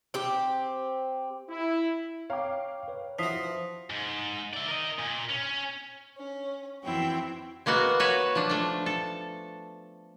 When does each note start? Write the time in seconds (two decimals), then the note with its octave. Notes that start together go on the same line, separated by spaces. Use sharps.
0.14 C4 G4
1.50 E4
2.30 C#5 F5 G5 A#5 D6
2.88 B4 C#5
3.19 F3 E4 F#4 D#6 B6 C7
3.90 G#2
4.54 D5 E5
4.68 A#4 D#5
4.99 A#2
5.29 C#4
6.17 C#4
6.83 F2 E3 C4 E4 F#4 G5
7.66 G#3 A#3 B3 F#4 F#5
8.00 F#4 B4 C#5 E5
8.35 F3 D4
8.50 A3 D4
8.86 A4